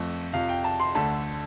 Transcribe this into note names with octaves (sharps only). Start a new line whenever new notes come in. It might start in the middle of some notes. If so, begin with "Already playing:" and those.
Already playing: F2 F3 A3
F2 C3 F3 F5
G5
A5
C6
D2 D3 A3 A5